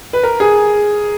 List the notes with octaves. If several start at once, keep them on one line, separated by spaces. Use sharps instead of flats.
B4
A#4
G#4